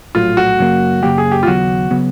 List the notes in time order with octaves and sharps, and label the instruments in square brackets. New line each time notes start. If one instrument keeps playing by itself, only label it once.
[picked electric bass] A#1 A2 F#3 [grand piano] F4
[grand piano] F#4
[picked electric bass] F#2 C#3 F#3 A#3
[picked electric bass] F#2 C#3 F#3 A#3 [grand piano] G4
[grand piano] G#4
G4
F4
[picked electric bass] D#2 C#3 F#3 B3 [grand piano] F#4
[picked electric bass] C#3 F#3 B3